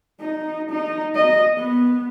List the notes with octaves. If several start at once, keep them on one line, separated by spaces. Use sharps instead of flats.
D#4
D#4
D#5
B3